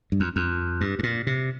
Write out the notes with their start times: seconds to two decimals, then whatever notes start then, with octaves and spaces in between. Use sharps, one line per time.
0.12 G2
0.20 F2
0.36 F2
0.81 G2
0.99 G2
1.03 A#2
1.27 C3